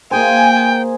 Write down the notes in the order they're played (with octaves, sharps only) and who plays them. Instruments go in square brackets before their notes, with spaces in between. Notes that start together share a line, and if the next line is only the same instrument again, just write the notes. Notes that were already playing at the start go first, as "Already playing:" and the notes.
[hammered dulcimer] A#3 G#4 C5 [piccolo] G5 [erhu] G#5